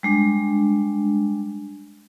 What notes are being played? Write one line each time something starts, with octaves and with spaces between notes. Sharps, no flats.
G3 G#3 D4